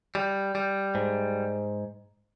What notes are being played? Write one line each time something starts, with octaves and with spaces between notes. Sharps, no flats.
G3
G3
G#2